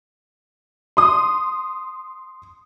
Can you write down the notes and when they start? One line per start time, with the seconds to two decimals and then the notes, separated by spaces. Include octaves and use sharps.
0.97 C6 D#6